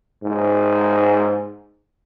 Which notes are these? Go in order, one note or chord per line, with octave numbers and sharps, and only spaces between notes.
G#2